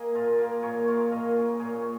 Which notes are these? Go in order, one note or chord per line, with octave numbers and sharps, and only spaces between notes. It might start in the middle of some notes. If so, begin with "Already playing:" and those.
Already playing: A#3 G#4 D#5
A#2 F4 A#4
A#3 F4
A#2 G#4 C#5
A#3 F4 C#5 F5
A#2 A#4 D#5
A#3 C#4 F4
A#2 G#4 C#5